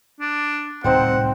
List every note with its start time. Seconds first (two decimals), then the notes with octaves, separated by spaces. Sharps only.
0.21 D4
0.84 D1 C2 A#2 C4 D#4 C5 F#5 G5